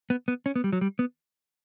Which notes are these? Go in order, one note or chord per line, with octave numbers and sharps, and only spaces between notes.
B3
B3
C#4
B3
G3
F#3
G3
B3